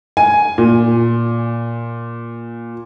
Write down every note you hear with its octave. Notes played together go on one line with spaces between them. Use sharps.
G#5
A#2